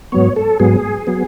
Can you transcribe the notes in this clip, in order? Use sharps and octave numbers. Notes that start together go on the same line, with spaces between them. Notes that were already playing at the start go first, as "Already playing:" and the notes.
G#2 F#3 B3 C#5
A4
G#2 F#3 B3 G#4
F#3 B3